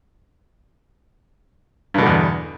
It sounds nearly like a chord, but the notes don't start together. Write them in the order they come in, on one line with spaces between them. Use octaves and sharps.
G2 B2 D3 E2